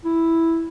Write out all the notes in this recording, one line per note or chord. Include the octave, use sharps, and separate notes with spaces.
E4